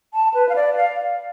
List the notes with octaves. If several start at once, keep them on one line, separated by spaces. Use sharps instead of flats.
A5
B4
F5
D5
F5